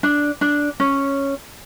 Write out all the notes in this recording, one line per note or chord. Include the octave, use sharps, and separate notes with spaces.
D4
D4
C#4